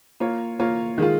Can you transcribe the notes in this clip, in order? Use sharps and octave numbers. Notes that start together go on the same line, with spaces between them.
A#3 F4 C#5
A#3 F4 C#5
D#3 G#3 F4